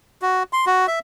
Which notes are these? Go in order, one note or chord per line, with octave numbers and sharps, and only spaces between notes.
F#4
C6
F#4
E5